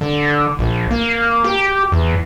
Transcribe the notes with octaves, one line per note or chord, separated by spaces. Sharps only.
D3
A#1
A#3
G4
E2